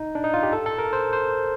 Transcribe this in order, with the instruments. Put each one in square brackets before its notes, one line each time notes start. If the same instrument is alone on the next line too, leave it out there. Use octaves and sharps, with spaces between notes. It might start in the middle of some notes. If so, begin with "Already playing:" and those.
Already playing: [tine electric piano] D#4
D4
D#4
F4
G4
A4
A4
A#4
C5
C5